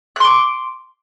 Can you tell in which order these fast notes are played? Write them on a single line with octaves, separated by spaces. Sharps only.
F#6 C6 D6